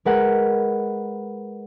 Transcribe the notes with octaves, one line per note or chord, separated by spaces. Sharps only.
G#3 A#4 B4 F#5